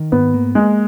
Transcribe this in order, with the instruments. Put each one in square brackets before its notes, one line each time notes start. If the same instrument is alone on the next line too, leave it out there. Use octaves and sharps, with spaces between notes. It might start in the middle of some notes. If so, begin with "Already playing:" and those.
Already playing: [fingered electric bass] D#3
[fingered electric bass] G#2 [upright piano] B3
[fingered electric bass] A#3
[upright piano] G#3 [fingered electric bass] A#3